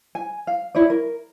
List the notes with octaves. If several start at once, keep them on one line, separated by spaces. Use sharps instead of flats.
G#5
F5
E4 C#5 D5
A#4